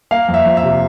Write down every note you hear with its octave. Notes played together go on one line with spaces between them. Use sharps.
A#3 F5
F2
E5
F3
E5
C3